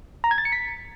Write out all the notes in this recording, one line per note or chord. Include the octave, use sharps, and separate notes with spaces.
A#5
G#6
A6
C#7
B6